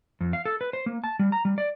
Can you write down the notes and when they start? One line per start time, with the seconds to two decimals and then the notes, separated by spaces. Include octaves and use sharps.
0.21 F2
0.33 F5
0.45 A4
0.61 B4
0.73 C5
0.86 A#3
1.04 A5
1.19 G3
1.32 A#5
1.45 G3
1.58 D5